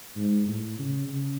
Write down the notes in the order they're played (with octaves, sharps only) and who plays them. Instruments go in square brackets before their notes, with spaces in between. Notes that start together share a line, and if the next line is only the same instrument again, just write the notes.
[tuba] G#2
A2
C#3
C#3